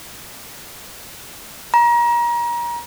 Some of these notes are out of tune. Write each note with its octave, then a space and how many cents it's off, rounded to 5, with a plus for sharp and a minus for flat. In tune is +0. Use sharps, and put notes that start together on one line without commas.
A#5 +30